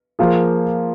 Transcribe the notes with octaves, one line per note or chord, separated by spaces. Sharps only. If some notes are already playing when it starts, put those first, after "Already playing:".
F3 A#3 F4 G#4